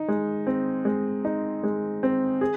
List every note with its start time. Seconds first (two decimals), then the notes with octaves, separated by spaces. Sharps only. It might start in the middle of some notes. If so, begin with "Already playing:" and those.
Already playing: D#4
0.08 G#3
0.47 C4
0.85 G#3
1.25 D#4
1.64 G#3
2.03 C4
2.41 G#4